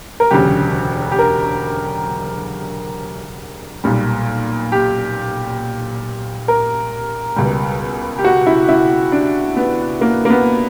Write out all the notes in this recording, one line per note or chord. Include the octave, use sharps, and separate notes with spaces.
A#4
E1 D2 C#3 F#3 G4
G4
A#4
B1 A#2 G3
G4
A#4
C#2 B2 G3
G4
F#4
E4
E4
D4
B3
A#3
A#3
B3